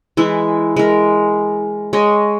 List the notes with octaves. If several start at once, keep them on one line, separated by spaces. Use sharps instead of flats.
E3 G#3 E4
G#3 A#4
G#3 C#5 D#5